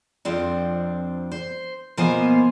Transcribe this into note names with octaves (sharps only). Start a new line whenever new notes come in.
F2 F3 C4 D4
C5
B2 F3 A#3 B3 C5 G#5